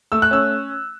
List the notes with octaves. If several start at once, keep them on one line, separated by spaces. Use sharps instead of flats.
A3 E6
F#6
C#4 E6